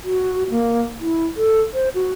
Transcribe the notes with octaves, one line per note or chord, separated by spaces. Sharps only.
F#4
A#3
E4
A4
C5
F#4